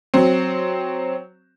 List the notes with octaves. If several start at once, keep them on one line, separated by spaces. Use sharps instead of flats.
F#3 C4